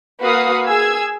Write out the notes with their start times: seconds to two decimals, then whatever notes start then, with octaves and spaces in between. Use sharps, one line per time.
0.20 A#3 F#4 B4 F5 D#6
0.67 G#4 E6 G#6